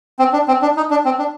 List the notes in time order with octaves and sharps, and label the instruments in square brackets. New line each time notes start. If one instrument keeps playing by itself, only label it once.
[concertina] C4
D4
C4
D4
D#4
D4
C4
D4